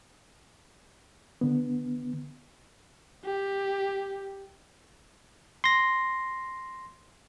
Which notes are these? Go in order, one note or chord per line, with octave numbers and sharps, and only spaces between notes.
D3 B3
G4
C6 A#6